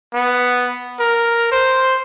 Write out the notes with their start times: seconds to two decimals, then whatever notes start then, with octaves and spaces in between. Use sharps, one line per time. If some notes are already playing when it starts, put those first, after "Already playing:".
0.14 B3
1.00 A#4
1.52 C5